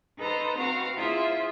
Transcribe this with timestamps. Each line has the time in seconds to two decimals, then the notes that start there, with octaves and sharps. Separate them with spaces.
0.19 D#4 A4 B4 C5 A#5
0.59 C4 F#4 F5 A#5
0.96 E4 F4 G#4 C5 E5